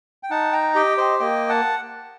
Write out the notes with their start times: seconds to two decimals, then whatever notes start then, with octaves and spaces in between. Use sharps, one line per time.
0.23 G5
0.30 D#4 F#5 A5
0.52 G5 A#5
0.75 G4 D#5 G5
0.98 C5 D#5
1.19 A#3 D#5 G5
1.49 F#5 A5